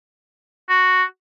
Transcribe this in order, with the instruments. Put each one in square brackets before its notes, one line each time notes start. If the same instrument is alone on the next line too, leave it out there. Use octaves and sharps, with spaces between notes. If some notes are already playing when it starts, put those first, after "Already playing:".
[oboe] F#4